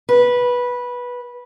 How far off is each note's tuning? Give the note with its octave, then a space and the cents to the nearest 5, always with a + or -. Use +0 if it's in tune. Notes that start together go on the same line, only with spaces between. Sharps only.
B4 -15